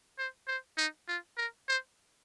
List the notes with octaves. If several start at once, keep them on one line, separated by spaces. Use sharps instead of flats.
C5
C5
D#4
F4
A#4
C5